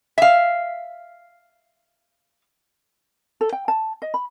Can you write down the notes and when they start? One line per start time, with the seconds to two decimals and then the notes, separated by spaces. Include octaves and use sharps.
0.18 E5 F5
3.41 A4
3.53 G5
3.68 A5
4.02 D#5
4.14 B5